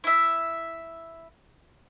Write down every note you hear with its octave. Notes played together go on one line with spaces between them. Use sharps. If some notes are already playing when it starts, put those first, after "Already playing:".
E4 E5